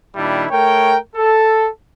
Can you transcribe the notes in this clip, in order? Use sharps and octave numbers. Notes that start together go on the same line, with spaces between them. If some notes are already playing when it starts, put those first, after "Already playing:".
A#2 D#3 G3 D4 E4
A3 A#4 C#5 G5
A4